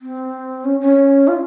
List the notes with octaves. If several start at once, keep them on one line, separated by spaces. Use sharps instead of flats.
C4
C#4
C#4
F4